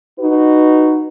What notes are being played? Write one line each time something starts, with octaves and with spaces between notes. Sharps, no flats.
D#4 F#4 B4